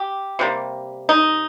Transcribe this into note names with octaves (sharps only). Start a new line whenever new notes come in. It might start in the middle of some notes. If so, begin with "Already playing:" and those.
Already playing: G4
C3 G3 A#3
D#4